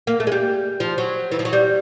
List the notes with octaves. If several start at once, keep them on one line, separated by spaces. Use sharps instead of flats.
A#3
A3
G#3
G3
F3
F#3
E3
F3
F#3
G3